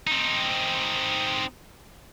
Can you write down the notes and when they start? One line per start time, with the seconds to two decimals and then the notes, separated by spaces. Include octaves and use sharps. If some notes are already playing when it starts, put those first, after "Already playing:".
0.07 C4 D#4